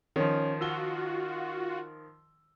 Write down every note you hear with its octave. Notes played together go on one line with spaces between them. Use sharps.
D#3 F3 C#4
F4 F#4 E6 G7